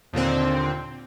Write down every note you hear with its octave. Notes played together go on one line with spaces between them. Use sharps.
D#2 A#2 D3 C4